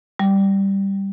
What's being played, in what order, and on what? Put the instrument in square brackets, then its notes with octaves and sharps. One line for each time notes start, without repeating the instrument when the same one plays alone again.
[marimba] G3